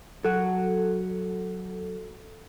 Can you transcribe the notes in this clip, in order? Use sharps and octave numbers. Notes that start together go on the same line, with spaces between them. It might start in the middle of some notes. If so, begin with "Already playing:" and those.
F#3 F#4 A4